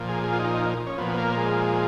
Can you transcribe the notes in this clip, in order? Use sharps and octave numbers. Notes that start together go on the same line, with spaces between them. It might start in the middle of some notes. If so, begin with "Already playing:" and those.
Already playing: A#2 F3
G#4
G#4
F4
D#4
C#4
A#2 F3 B3
A#3
G#3